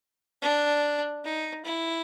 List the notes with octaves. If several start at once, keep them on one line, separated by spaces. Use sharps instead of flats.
D4
D#4
E4